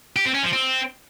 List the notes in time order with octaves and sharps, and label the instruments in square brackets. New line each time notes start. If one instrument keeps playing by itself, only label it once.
[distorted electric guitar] G4
C4
C#4
F3
C4